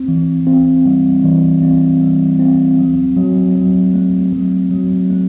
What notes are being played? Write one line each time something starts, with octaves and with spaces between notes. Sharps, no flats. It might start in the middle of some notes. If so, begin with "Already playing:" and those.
Already playing: C4
E3
C4
G3
E3
C4
G3
C4
F#3
F#3
F#3
A3
F#3
F#3
A3